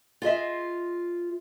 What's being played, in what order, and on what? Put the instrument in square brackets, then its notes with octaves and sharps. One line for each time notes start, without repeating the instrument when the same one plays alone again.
[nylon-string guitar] F4 G#4 D#5 E5